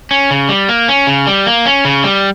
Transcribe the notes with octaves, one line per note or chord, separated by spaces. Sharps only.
C#4
C#3
G3
A#3
C#4
C#3
G3
A#3
C#4
C#3
G3